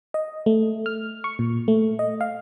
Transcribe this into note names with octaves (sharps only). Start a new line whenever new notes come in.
D#5
A3
F6
C#6
A#2
A3
D#5
F5